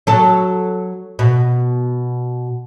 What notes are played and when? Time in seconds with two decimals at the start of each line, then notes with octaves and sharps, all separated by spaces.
0.07 F#3 A4
1.19 B2